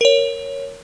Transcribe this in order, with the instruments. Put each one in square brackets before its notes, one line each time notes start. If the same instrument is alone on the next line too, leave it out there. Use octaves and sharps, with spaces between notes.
[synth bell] A#4 C#5